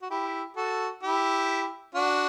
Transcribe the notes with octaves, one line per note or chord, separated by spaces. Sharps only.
F#4
E4 G4
F#4 A4
E4 G4
D4 F#4